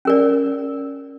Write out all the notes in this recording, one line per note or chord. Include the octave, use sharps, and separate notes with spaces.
C#4 A#4 D5